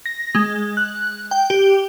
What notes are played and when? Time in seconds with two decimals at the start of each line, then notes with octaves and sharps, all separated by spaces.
0.06 A#6
0.35 G#3
0.77 F#6
1.31 G5
1.50 G4